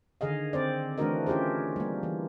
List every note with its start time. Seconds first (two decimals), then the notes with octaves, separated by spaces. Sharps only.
0.21 D3 D#3 G#4 D#5 F5
0.53 C4 C5 D5
0.98 E3 A3 D4 F#4 A#4 D#5
1.26 C#4 F4 G4 G#4 C5
1.76 G3 A#3
2.03 E3